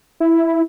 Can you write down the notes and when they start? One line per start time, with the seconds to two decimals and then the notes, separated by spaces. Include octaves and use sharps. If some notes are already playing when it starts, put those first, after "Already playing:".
0.20 E4